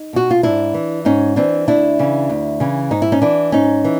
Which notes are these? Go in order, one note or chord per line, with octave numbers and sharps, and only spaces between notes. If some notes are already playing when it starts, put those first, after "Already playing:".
Already playing: D#4
B2 F#4
F4
G#2 D4 E4
E3
G#2 C#4 D#4
E3 C4 D4
D2 D4 E4
C#3 E3
D2
C#3 E3
G#2 D#4
E4
C#4 D#4
E3 D4 E4
G#2 C#4 D#4
E3